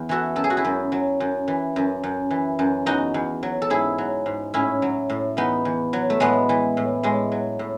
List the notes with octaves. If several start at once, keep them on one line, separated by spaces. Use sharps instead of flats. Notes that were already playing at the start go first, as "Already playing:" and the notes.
Already playing: E2
E3 F#4 A4
F#2 A4
G#4
F#4
E4 G#4
F#2
F#3
F#2
E3
F#2
F#2
E3
F#2
E2 D#4 F#4
E2
F#3
A4
G#2 E4 G#4
F#3
G#2
A2 C#4 E4
F#3
A2
E2 B3 D#4
E2
F#3
A3
A2 G#3 B3
E3
A2
A2 G#3
F#3
A2